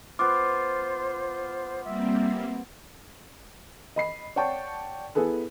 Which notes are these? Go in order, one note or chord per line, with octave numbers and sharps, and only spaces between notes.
B3 F4 C5 D6
G3 A#3 C4 E5
D#5 B5 C7
C#5 D5 F#5 G5 A5 C#6
B3 E4 G#4 A4 B4